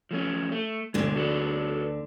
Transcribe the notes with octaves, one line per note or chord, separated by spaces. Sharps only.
F3 A3 C#4
A3
D2 B2 D3 G#3
F#4 A4 B4